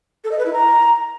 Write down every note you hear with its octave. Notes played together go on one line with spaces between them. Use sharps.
A4
D#5
B4
E4
A#5